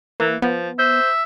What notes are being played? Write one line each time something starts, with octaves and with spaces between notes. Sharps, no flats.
E3 A#3
F3 B3
C5 E5